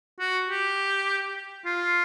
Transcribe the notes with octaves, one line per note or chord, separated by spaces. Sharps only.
F#4
G4
F4